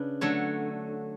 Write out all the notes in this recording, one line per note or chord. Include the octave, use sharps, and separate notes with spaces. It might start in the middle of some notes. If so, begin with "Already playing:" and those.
Already playing: C#3 D4 B4
D3 F#3 A3 C#5